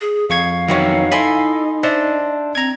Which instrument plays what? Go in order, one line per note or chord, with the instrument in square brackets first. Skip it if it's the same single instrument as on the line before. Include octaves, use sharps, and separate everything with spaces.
[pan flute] G#4
[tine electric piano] F2 C#6 G#6 [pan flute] F5
[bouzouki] D#3 E3 C#4 [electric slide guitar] F#3 D#4 F#4
[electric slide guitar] D#4 [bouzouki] E4 A4 G#5 [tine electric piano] B5 C6
[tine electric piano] D4 E5 A5 [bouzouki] C5 [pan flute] D#5
[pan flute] C4 [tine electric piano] A#5 G#6